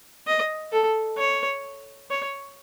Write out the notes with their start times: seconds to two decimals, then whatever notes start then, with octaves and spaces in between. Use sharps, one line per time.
0.27 D#5
0.72 A4
1.18 C#5
2.10 C#5